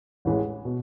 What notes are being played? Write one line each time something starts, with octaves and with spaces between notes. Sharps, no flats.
A1 A2 E3 G#3
B2